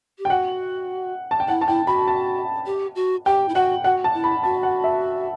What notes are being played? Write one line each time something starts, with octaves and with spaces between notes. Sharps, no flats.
G4
G5
F#4 F#5
A5
G5
E4 F#5
A5
E4 G5
F#4 B5
A5
G4
F#4
G4 G5
E4
F#4 F#5
F#4 F#5
A5
E4
B5
F#4 A5
F#5
E5